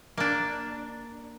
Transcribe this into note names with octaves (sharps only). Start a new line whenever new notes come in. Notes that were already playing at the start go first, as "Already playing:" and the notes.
A#3 D4